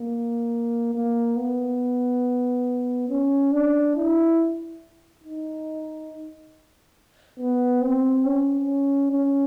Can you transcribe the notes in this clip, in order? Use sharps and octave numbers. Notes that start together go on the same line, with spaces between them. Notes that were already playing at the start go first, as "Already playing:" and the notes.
Already playing: A#3
A#3
B3
C#4
D4
E4
D#4
B3
C4
C#4
C#4